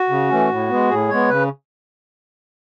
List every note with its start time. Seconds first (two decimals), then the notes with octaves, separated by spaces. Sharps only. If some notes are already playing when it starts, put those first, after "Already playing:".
Already playing: F#4
0.09 C#3
0.29 E3 A3 C#4
0.50 A2
0.69 G#3 B3
0.89 A2 G#4
1.09 G#3 B3 C#5
1.29 C#3 B4